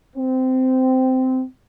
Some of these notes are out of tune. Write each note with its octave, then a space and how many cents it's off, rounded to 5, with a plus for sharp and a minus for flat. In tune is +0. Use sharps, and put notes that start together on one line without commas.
C4 -15